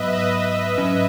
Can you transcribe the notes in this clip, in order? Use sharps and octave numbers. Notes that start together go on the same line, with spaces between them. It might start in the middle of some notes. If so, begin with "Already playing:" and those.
Already playing: G#2 F#3 B3 B4 D#5 E5
B4 D#5
G#2 F#3 C#4